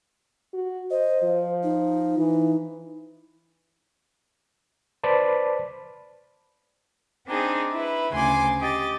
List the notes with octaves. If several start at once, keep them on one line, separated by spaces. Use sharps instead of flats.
F#4
C5 D#5
F3
D#4
E3
B4 C5 D5 A5 B5
C4 D4 D#4 G#4
E4 B4
D2 C#3 G#5 C6 D6
G4 D#5 D6 A6